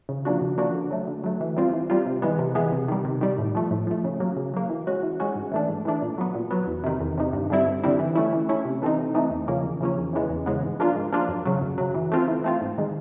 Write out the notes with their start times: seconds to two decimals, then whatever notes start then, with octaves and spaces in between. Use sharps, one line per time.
0.09 C#3
0.25 F3 A#3 D4 F#4
0.42 C#3
0.58 F3 A#3 D4 F#4
0.74 D3
0.91 F#3 A3
1.07 D3
1.24 F#3 A3
1.41 E3
1.56 G3 C4 F4
1.73 E3
1.90 G3 C4 F4
2.06 C3
2.22 E3 G#3 B3
2.39 C3
2.55 E3 G#3 B3
2.72 C3
2.88 D#3 G3
3.05 C3
3.21 D#3 G3
3.38 A2
3.55 F3 A3
3.71 A2
3.87 F3 A3
4.04 C#3
4.20 F#3 A#3
4.37 C#3
4.54 F#3 A#3
4.70 E3
4.87 G#3 C#4 F#4
5.03 E3
5.20 G#3 C#4 F#4
5.35 G#2
5.52 E3 A3 D4
5.69 G#2
5.85 E3 A3 D4
6.02 A#2
6.18 F#3 B3
6.35 A#2
6.51 F#3 B3
6.67 E2
6.84 C3 D#3
7.01 E2
7.18 C3 D#3
7.33 G2
7.50 D3 G3 C4 E4
7.67 G2
7.84 D3 G3 C4 E4
7.99 E3
8.15 A3 C#4 E4
8.33 E3
8.49 A3 C#4 E4
8.65 C3
8.82 E3 A3 C4 D#4
8.98 C3
9.15 E3 A3 C4 D#4
9.31 E2
9.48 C#3 F3 A#3 C#4
9.64 E2
9.81 C#3 F3 A#3 C#4
9.97 E2
10.13 C#3 E3 G#3 B3
10.30 E2
10.46 C#3 E3 G#3 B3
10.63 G#2
10.80 F3 A#3 D4 F4
10.96 G#2
11.12 F3 A#3 D4 F4
11.28 F#2
11.45 C#3 F#3
11.61 F#2
11.78 C#3 F#3
11.94 E3
12.12 A3 C4 F4
12.28 E3
12.44 A3 C4 F4
12.61 G#2
12.78 D#3 G#3